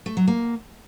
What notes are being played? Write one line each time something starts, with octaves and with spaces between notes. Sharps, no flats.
A3
F#3
A#3